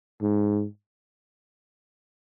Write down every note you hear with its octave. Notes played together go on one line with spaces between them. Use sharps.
G#2